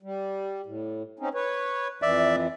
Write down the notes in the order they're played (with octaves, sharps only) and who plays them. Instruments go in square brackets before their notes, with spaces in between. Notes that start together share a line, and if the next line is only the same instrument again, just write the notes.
[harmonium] G3
A2
C4 C#4 D#4
B4 C#5
[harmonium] F2 E3 [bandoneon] D5 E5